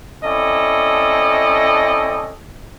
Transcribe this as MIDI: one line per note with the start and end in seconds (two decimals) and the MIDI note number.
0.23 2.34 60
0.23 2.34 61
0.23 2.34 64
0.23 2.34 69
0.23 2.34 74
0.23 2.34 75